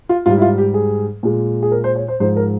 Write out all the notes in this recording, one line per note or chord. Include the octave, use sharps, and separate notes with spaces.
F4
G#2 G3 F4
E4
F4
G4
G#4
A#2 G#3
G#4
A#4
C5
C#5
C5
G#2 F3 G#3 C5
A#4